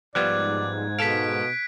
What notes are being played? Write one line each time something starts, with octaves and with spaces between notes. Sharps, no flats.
G#2 F3 G3 B3 D5 F#6 G#6
B2 A4 F5 B6 D7